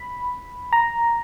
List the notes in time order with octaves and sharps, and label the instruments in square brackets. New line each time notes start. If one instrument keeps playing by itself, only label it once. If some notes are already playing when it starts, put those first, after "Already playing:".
Already playing: [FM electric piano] B5
A#5